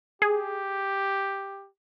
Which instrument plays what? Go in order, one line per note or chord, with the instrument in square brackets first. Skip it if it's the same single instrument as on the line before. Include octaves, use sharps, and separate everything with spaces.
[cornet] G4 [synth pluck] G#4